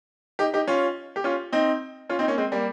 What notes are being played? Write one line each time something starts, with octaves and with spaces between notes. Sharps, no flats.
D#4 G4
D#4 G4
C#4 F4
G4
C#4 F4
C4 D#4
C#4 F4
C4 D#4
A#3 C#4
G#3 C4
G3 A#3